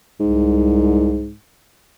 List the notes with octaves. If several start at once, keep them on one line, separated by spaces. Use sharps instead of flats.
C2 G#2